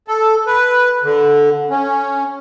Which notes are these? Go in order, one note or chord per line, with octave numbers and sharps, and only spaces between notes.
A4
B4
D3
C#4